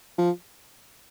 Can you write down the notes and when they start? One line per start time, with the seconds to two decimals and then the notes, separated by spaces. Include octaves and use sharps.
0.18 F3